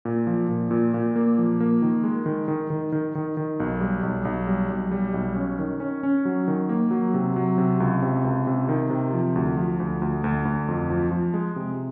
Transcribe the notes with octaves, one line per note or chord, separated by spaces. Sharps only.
A#2
F3
A#2
A#2
A#2
A#3
F3
A#3
D#3
G#3
D#3
D#3
D#3
D#3
D#3
D#3
B1
G3
B1
B1
G3
B1
G3
B1
C#4
D#3
C#4
C#4
F#3
D#3
A#3
F#3
C3
F#3
C3
C#2
C3
C#2
C3
D#3
C3
F3
D2
F3
D2
D2
D2
D2
F2
F3
F3
G#3
C3